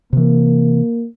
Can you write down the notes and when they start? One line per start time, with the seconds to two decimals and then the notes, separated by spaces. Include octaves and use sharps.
0.13 C3 E3 A#3